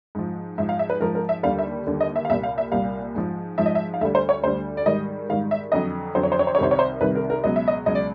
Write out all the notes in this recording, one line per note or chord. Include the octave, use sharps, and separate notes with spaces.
G#2 F3
G#2 F3 E5
F5
E5
B4
G#2 F3 A#4
A#4
E5
D#2 D3 G3 F5
E5
D#2 D3 G3
D#5
E5
F5
C2 A#2 G3 E5
F5
E5
C2 A#2 G3 F5
G#2 F3
G#2 F3 E5
D#5
E5
F5
D2 D3 G3 E5
C5
C#5
D2 D3 G3 C5
D5
G#2 D#3 G3 D#5
G#2 D#3 G3 F5
E5
F2 D3 F#3 D#5
F2 D3 F#3 C5
C#5
C5
C#5
C5
C#5
C2 C3 D#3 G3 C5
C#5
C5
C2 C3 D#3 G3 B4
A#4
A#4
C#2 B2 F#3 D#5
E5
D#5
C#2 B2 F#3 D#5
D5